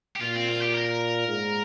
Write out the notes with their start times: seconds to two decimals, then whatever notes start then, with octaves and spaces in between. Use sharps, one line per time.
0.16 G4
0.21 A#2 F4
0.35 C4
0.48 F4
0.61 G4
0.74 A#4
1.27 G#2